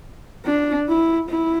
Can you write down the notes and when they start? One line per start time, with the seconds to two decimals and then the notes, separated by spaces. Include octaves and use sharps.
0.46 D4
0.88 E4
1.30 E4